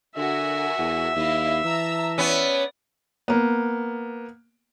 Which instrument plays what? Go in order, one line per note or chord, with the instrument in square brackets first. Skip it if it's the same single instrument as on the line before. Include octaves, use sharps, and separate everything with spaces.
[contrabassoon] D3 [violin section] F#4 A#4 G#5 [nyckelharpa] E5
[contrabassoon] E2
[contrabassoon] D#2 [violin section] E4 D#5 F5
[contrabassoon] E3 [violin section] A5 A#5 E6
[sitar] B3 C#4 [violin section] D5
[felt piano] A#3 B3